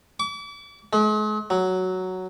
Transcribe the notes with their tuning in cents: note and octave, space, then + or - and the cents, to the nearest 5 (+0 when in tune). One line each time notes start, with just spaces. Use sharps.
D6 -40
G#3 +45
F#3 +5